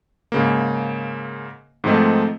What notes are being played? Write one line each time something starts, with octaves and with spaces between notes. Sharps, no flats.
G#2 C#3 A#3
G#2 D#3 F3 A3 C4 D#4